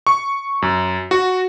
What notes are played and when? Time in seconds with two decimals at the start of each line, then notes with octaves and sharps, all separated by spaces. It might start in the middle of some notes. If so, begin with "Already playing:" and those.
0.07 C#6
0.62 F#2
1.11 F#4